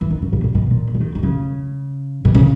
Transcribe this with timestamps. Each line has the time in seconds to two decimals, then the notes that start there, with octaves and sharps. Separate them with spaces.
0.01 E3
0.10 D#3
0.22 C#3
0.33 A#2
0.44 A#2
0.55 B2
0.71 A#2
0.94 C#3
1.00 D#3
1.15 D#3
1.23 C#3
2.25 B2
2.35 C#3